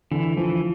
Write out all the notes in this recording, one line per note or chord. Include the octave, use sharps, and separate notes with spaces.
D3 E3
E3 F3